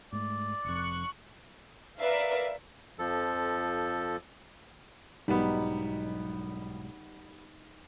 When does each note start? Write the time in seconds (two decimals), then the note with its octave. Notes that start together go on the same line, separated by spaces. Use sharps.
0.12 G#2 A3 D5
0.64 F1 F2 C#6 F#6 C#7
1.99 A#4 B4 D5 E5 F5
2.99 F2 F3 A4
5.28 B1 G#2 F#3 G3 B3 D#4